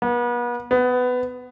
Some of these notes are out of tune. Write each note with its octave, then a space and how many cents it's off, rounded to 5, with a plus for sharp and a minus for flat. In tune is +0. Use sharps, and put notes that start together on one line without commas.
B3 -40
B3 +15